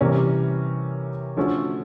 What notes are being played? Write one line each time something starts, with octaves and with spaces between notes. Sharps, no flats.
C3 E3 G3 A#3 C#4
D3 F3 A3 C#4 F#4